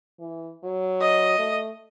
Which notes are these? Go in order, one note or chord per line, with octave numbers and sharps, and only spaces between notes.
E3
F#3
D#5
A3